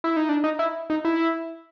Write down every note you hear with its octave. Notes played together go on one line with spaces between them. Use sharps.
E4
D#4
D4
D#4
E4
D#4
E4